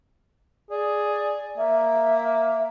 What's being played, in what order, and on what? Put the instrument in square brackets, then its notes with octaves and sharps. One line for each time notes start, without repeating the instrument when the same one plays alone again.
[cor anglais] G#4 [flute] D5
[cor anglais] A#3 [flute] E5